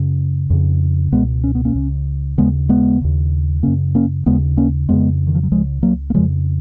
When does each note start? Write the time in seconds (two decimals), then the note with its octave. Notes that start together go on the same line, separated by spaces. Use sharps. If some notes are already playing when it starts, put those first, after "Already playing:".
Already playing: F#2 C#3
0.50 F2 C#3
1.12 C#2 B2 G#3 B3
1.44 C#4
1.55 B3
1.65 A#3 C#4
1.75 C#2 C#3
2.38 D#2 C#3 G#3 B3
2.69 G#3 B3
3.01 D#2 C#3
3.63 F#2 C#3 A#3 C#4
3.95 A#3 C#4
4.26 D#2 C#3 G#3 B3
4.57 A#3 C#4
4.89 F2 C#3 G#3 B3
5.27 D#3
5.35 F3
5.43 F#3
5.51 C#2 C#3 F3 G#3
5.83 F#3 A#3
6.10 A#3
6.14 F2 C#3 F3 G#3